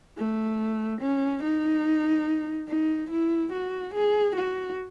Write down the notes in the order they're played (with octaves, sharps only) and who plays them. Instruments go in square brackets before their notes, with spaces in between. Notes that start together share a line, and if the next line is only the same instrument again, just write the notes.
[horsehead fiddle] A3
C#4
D#4
D#4
E4
F#4
G#4
F#4